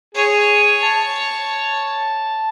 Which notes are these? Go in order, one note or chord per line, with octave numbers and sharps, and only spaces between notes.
G#4 C#5
A5